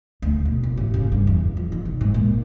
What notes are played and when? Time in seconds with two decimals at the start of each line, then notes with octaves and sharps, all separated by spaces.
0.22 D2
0.45 B2
0.63 F#1
0.77 A1
0.94 C#3
1.12 G2
1.27 E2
1.57 F3
1.72 D#3
1.85 B1
2.01 G#2
2.14 A#2